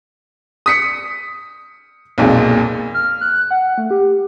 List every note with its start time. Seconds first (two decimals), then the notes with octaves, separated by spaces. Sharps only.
0.66 D#6 B6 C#7
2.18 B1 F2 A#2 G#3
2.94 F6
3.21 F#6
3.51 F#5
3.78 A3
3.91 G4